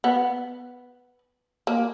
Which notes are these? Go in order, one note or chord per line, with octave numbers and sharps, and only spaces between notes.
B3
A#3